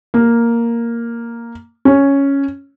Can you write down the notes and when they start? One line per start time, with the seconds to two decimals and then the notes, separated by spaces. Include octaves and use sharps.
0.14 A#3
1.85 C#4